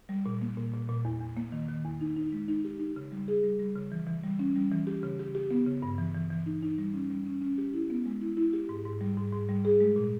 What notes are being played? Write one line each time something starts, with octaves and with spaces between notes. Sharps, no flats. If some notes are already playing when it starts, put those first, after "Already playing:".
G3
A#2
A#3
A#2
A#2
A#2
E2
E2
A#3
D#3
D#3
E2
D#4
D#4
G#3
D#4
G4
D#4
C#3
G3
G#4
G3
G3
C#3
E3
E3
G3
C#4
G3
E3
G4
C#3
G4
G4
B3
C#3
G2
E3
E3
E3
D#4
D#4
G3
C#4
G3
C#4
C#4
G4
E4
B3
G#3
E4
E4
G4
G#2
G#2
G3
G#2
G#2
G3
G#4
G#3
A#2